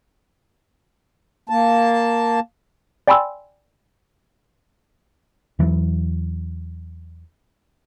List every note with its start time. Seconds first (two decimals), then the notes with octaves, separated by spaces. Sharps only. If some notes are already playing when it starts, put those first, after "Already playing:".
1.49 A#3 A5
3.08 D5 G5 G#5 B5 C6 E6
5.59 E2 E3 F#3